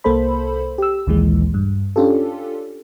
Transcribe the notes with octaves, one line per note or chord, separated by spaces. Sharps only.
C2 A#3 A4 C5 B5
G4 E6
A#1 D#2 A#2 E3 G#3
G2
C#4 D4 F4 G4 A4